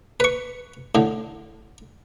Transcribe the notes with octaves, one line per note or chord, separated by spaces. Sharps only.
B4 C#6
A2 D3